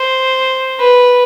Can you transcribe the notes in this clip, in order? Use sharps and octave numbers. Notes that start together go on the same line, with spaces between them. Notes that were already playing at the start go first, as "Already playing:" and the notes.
Already playing: C5
B4